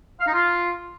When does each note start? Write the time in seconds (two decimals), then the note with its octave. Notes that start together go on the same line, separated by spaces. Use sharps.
0.20 F5
0.27 D#4
0.34 F4